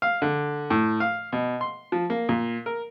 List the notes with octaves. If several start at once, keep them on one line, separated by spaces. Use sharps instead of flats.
F5
D3
A2
F5
B2
C6
F3
A#3
A#2
A#4